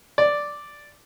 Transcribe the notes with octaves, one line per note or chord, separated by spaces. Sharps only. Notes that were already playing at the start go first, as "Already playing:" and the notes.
D5